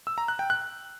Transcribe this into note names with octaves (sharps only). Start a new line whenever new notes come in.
E6
A#5
F#6
G5
F#6